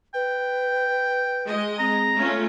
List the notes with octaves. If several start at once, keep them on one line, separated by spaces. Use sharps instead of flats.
B4 G5
G#3 D#5
C4 A#5
A3 C#4 F4